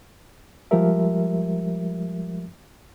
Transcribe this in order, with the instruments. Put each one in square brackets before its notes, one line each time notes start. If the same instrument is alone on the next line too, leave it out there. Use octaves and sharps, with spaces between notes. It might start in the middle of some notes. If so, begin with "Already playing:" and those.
[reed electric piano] F3 G3 G#3 G4 A#4 E5